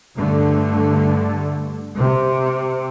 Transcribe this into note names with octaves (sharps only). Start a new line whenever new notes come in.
G2 D3 A3
C3